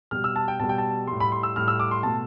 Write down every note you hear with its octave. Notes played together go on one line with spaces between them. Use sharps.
B2 G3 F6
E6
A5
G5
B2 G3 A5
G5
A5
A2 G3 C6
B5
C6
E6
A2 G3 F6
E6
D6
C6
B2 A3 A5